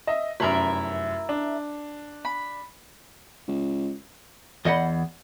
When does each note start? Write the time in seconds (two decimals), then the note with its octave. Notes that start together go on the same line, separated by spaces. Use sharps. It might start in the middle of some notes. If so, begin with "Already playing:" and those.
0.07 D#5 E5
0.40 F1 F#2 E4 A#4 E5
1.29 D4
2.25 B5
3.48 C#2
4.65 E2 D#5 F#5 B5